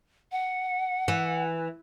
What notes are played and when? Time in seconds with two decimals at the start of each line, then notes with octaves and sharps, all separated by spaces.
0.32 F#5
1.08 E3